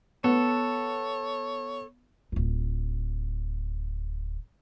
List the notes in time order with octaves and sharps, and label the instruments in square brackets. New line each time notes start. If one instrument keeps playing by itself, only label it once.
[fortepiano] B3 [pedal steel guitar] A4 [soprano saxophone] C#5
[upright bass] D1 F4